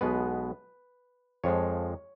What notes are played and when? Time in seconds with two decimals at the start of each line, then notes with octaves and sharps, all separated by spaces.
0.01 B1 B2 G#3 B3 B4
1.44 F2 F3 G#3 C#5